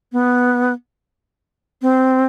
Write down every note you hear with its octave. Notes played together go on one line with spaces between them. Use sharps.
B3
C4